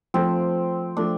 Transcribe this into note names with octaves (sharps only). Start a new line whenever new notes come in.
F3 A3 C4 F4
F3 A3 D4 F4